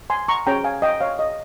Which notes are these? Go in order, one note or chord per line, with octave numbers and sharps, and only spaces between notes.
G#5 C6
A#5 C#6
C#4 G#4 C#5 G5 A#5
F5 G#5
D#5 G5
C#5 F5
D#5